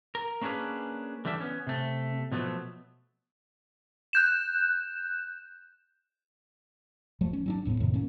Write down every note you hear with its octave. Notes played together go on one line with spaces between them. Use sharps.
A#4
A#3 C#4 D4 F#4 G#4 B4
D3 E3 G3 D4 E5
B3 C#4
C3 A3
B2 F3 F#3 A3 B3
F#6 G6 E7
E1 F3 F#3 A3
C#4
F#3 C#4 D4
D#1 A2 A#3 B3
F2 A2 C3 D#3
A#3 C#4